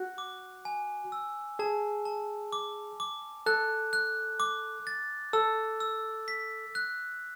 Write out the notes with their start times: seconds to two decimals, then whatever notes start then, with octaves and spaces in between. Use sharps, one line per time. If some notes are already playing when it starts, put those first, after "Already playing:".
Already playing: F#4 F#6
0.18 D6
0.65 G#5
1.12 E6
1.59 G#4 A5
2.05 A5
2.53 D6
3.00 D6
3.46 A4 F#6
3.93 F#6
4.40 D6
4.87 A6
5.33 A4 E6
5.80 E6
6.28 B6
6.75 F#6